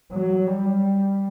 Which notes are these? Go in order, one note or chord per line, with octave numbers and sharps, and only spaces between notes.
F#3
G3